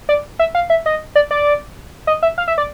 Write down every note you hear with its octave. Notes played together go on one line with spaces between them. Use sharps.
D5
E5
F5
E5
D#5
D5
D5
D#5
E5
F5
E5
D5